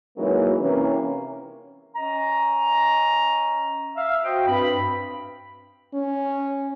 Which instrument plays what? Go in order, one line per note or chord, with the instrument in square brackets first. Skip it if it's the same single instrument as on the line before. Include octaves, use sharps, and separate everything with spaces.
[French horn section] E3 F#3 G#3 A#3 C#4 D#4
C3 E3 A#3 C#4
[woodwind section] C#4 D#5 A#5
E5 F5
F#4 C5 D#5 G5
G2 C4 B5
[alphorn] C#4